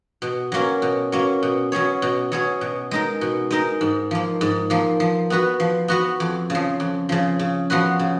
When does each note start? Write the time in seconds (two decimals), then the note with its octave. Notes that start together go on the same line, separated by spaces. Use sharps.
0.22 B2
0.52 F#3 A#3 C#4
0.82 B2
1.12 F#3 A#3 C#4
1.43 B2
1.72 F#3 C#4 G#4 C#5
2.02 B2
2.32 F#3 C#4 G#4 C#5
2.61 B2
2.91 G#3 D#4 A#4
3.21 B2
3.51 G#3 D#4 A#4
3.81 G#2
4.11 F3 A#3
4.41 G#2
4.70 F3 A#3
5.00 F3
5.30 B3 F#4 B4
5.60 F3
5.88 B3 F#4 B4
6.20 F2
6.50 C#3
6.55 F3
6.80 F2
7.09 C#3 F3
7.39 C#3
7.70 F3 B3 F#4 B4
7.99 C#3